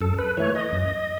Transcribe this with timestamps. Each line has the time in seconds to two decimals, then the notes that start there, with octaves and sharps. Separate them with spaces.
0.01 F#2 A4
0.19 B4
0.37 E3 A3 C#5
0.55 D#5
0.72 F#2